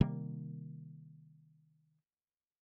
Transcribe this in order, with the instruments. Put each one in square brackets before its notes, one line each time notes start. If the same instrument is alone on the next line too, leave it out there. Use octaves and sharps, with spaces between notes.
[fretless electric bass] C3 D#3 G3 A#3